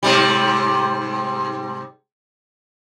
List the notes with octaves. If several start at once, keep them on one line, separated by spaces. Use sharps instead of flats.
G#2 C3 G3